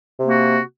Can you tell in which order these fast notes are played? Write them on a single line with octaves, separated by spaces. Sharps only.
C3 A#3 F#4